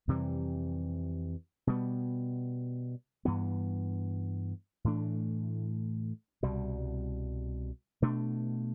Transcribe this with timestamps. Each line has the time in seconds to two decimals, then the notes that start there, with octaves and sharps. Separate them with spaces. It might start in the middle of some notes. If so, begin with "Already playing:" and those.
0.08 F2 C3 E3 G3
1.67 B2 G3 B3
3.25 G2 E3 B3
4.84 A2 E3 A3 D4
6.43 C2 B2 G3
8.02 B2 A3 D4